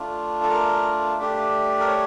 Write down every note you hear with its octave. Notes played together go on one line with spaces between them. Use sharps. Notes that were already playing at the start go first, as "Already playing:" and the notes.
Already playing: A3 D4 F4
A4
A#4
A3 D4 G4
A#4
C#5